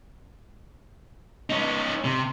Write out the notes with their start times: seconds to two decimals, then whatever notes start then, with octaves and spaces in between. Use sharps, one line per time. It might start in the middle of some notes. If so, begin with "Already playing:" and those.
1.50 C#4 D#4
2.04 C3